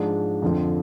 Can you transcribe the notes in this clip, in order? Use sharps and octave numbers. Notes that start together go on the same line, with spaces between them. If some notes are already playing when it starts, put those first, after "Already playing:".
Already playing: G#2 F3 G#3 D4
F2 D3 F3